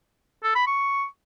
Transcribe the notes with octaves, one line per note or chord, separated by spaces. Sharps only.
A4
B5
C#6